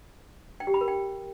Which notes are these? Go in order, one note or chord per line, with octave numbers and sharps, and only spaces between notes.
G5
G4
B5
A#4
G5